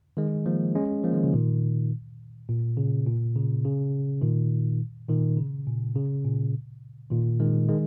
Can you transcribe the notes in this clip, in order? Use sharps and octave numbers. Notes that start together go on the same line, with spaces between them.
D#3 G#3
F3 A#3
G#3 C#4
F3 A#3
D#3 G#3
C#3 F3
A#2 D#3
A#2
C#3
A#2
C#3
C#3
A#2 D#3
A#2 D#3
C#3
A#2
C#3
A#2
A#2 D#3
D#3 G#3
D#3 G#3